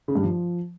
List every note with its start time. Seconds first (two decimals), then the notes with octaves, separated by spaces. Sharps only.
0.08 C#3
0.15 G2
0.23 F3